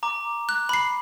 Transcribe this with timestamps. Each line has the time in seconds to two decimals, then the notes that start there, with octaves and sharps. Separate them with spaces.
0.03 A#5 D6
0.49 F#6
0.69 B5 C7